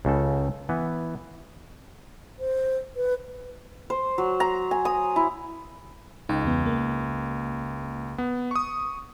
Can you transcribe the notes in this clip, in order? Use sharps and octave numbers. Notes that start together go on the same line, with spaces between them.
C#2 C#3 A4
E3 B3
C5
B4
C5
F#3
A#5
G#5
D#6
E4
C#2 D#4 D#5 G5
E2 B3
A#3
B3
C#6 D#6